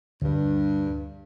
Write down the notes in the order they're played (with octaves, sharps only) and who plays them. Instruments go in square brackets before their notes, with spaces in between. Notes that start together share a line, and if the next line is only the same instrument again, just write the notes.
[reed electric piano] D2 [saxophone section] G2